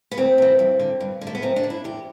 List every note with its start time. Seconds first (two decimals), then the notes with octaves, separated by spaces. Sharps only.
0.11 B3
0.17 D2 C4
0.38 C3 E3
0.59 G2
0.79 D3
1.00 G2
1.21 D3
1.27 A3
1.35 B3
1.42 F#2 C4
1.56 D4
1.64 D3
1.70 E4
1.84 E2 G4